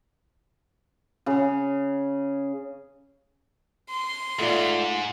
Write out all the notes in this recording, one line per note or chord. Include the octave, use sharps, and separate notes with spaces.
C#3 G#4
C6
G#2 A3 F4 D5